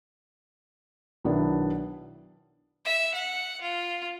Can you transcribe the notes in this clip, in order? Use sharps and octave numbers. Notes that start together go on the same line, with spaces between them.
B1 D#3 B3 D4 E4
E5
F#5
F4